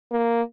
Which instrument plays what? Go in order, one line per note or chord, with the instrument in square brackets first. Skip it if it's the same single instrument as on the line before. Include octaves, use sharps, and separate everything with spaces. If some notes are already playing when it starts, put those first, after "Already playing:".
[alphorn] A#3